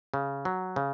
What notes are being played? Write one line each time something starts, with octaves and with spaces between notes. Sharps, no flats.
C#3
F#3
C#3